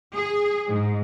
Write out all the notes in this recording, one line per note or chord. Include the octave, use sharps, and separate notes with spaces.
G#4
G#2